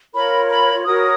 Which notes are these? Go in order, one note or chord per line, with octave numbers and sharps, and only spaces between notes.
F4 A#4 C#5 B5
B5
F#4 A#4 C#5 D#6